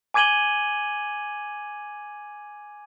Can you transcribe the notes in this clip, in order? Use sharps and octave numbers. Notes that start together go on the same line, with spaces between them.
G#5 D6 G#6 D#7 F#7 G7